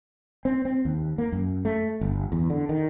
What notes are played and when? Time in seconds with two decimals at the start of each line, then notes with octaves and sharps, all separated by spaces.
0.45 C4
0.65 C4
0.85 D#2
1.18 A#3
1.32 F#2
1.65 A3
2.01 G1
2.32 E2
2.50 D3
2.69 D#3